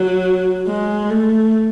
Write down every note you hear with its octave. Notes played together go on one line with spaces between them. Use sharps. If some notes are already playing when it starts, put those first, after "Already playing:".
Already playing: F#3
G#3
A3